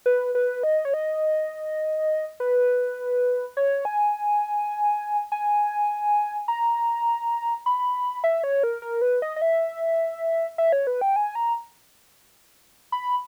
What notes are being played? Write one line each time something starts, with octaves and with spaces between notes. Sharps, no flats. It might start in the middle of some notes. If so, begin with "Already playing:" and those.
B4
B4
D#5
C#5
D#5
B4
C#5
G#5
G#5
A#5
B5
E5
C#5
A#4
A#4
B4
D#5
D#5
E5
E5
C#5
B4
G5
G#5
A#5
B5